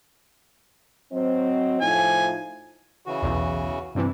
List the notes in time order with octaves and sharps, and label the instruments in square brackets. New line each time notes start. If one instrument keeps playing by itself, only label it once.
[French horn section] F#3 C4 D#5
[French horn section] A2 F3 D#4 [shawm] G#5
[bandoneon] C#3 E3 F#4
[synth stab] B1 E2
G2 C3 E3